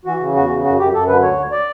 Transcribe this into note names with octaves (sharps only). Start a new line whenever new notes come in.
E3 F#4
C#3
E2 F#4
C#3
F#2 F#4
F#2 G4
F#2 A4
D3 B4
D2 C#5
D2
D5